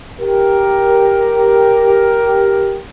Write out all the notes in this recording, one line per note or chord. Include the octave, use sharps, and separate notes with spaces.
G4 A#4